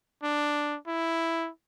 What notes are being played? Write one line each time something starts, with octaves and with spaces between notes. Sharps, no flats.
D4
E4